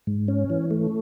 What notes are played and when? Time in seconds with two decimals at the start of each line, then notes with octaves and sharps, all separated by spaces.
0.07 G#2
0.28 C#4
0.50 E3
0.71 A3